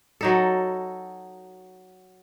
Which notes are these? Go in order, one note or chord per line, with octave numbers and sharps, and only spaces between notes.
F#3 D#4 A4